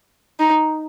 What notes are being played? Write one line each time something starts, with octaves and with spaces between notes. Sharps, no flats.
D#4